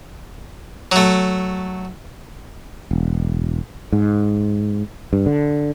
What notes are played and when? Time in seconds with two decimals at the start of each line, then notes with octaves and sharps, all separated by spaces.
0.92 F#3 A3
2.91 E1
3.92 G#2
5.13 G2
5.26 D3